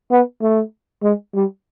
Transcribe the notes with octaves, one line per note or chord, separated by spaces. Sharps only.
B3
A3
G#3
G3